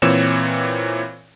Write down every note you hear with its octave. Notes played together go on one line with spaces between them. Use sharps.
A#2 E3 C4 C#5 E7